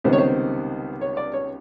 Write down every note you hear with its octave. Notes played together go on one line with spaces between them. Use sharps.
C#2 C3 D#3 G3 B3 C5
C#5
C5
C#5
D5
C#5